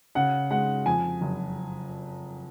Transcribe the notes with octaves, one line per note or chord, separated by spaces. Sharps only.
C#3 F#5
G#3 F#5
F2 G#5
F#1